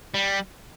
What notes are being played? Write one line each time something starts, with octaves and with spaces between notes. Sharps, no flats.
G3